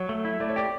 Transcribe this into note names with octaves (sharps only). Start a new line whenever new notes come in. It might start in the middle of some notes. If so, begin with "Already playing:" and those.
Already playing: F#3 C#5
A3
E4
A3 D5
C#5
G4 D5